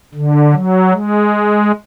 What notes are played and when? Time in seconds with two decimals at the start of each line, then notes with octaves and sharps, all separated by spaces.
0.14 D3
0.53 F#3
0.91 G#3